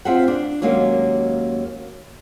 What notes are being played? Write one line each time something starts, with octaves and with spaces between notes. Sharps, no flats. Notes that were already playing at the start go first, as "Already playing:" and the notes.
C4 F4 G#4 E5 F#5
D4
D#2 F#3 G#3 A#3 C#4